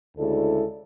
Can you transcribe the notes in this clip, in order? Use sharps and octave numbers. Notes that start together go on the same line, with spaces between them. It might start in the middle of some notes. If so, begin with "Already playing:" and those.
D2 C#3 G#3 E4 A4 D5